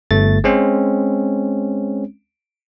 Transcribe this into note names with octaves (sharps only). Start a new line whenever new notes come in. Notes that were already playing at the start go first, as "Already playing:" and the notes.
G1 A3 A6
G#3 C4 C#4